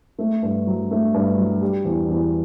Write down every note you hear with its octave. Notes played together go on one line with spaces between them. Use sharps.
A3
G2
F#3
A3
G2
F#3
G3
E2
E2